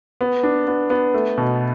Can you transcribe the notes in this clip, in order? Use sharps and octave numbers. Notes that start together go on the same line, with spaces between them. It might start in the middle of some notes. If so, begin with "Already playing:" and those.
B3
D4
B3
B3
A3
B2